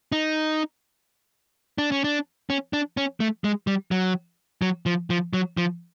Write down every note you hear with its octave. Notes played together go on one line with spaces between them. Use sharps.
D#4
D4
C#4
D4
C#4
D4
C#4
A3
G#3
G3
F#3
F#3
F3
F3
F#3
F3